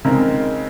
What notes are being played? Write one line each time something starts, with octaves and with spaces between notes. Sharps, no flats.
C#3 G#3 C4 D#4 A#4